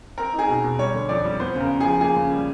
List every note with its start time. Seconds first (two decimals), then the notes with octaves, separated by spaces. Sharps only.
0.18 C4 A#4
0.33 D#4
0.39 G#4
0.49 B2
0.64 B2
0.79 G3 C#5
0.94 D3
1.09 F2 D5
1.25 G3
1.40 B3 C5
1.55 C#3
1.60 A#4
1.70 C#3
1.80 G#4
1.85 F3
2.00 A#3 G#4
2.16 C#3
2.32 G3